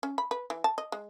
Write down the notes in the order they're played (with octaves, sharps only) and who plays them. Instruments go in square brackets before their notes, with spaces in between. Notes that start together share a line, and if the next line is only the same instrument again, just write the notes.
[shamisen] C#4
B5
B4
E3
A5
D#5
G#3